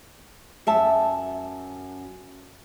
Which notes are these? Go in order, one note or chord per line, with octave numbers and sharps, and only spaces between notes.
F#2 E5 A5